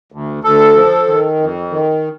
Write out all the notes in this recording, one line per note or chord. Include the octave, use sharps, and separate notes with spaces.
D2
D2 A4
F3
D#3
F2
D#3